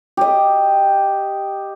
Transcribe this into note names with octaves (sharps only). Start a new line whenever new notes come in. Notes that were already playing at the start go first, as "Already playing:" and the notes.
G4 D#5